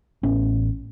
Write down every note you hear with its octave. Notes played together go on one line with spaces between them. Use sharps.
A1 B3 C#4